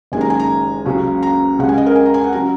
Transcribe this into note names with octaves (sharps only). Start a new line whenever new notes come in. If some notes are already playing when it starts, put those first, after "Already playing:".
F#1 F#2 D#3 G#3 G#5
A#5
G#5
A#5
C#2 C#3 F#3 C#4
A#5
C#2 C#3 G#3 C#4 F#5
G#5
D#5
A#4
G#5
A#5
G#5
F#5
F#3 C#4 A#5